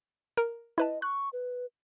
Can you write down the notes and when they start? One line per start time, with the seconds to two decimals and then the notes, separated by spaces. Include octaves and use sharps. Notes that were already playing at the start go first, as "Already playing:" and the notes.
0.37 A#4
0.78 E4 B4 D#5 A5
1.02 C#6 F#6
1.33 B4